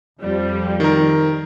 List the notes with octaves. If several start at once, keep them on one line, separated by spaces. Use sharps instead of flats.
F2 F3 G3
D#3 A#4